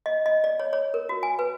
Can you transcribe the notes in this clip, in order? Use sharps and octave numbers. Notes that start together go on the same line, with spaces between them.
D#5
D#5
D5
C#5
C#5
A#4
F#4
G#5
B4